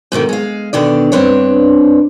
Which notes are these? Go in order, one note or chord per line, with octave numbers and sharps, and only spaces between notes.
G#2 B2 D#3 A3
G#3 F5
B2 D3 D#3 D5
G2 C4 D4 B4 C#5